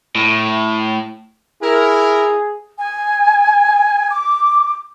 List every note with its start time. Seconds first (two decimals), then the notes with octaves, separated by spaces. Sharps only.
0.15 A2
1.62 E4 G#4 A#4
2.79 G#5
4.12 D6